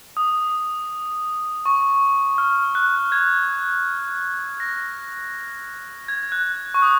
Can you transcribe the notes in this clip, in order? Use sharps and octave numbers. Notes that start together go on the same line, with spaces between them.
D#6
C#6
F6
F#6
G#6
A#6
G#6
F#6
C#6
D#6